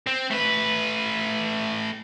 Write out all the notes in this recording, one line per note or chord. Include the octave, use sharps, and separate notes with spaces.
C4
A3 B4